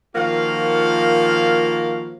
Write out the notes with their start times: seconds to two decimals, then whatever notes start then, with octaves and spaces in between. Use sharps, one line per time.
0.15 D#3 F3 A#3 F4 F#4 F5